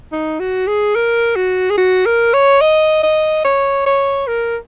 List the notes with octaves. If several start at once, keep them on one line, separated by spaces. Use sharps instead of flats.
D#4
F#4
G#4
A#4
F#4
G#4
F#4
A#4
C#5
D#5
D#5
C#5
C#5
A#4